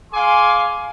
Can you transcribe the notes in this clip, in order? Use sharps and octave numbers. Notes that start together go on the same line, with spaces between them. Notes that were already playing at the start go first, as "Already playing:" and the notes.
G#4 F5 G#5 C6 D6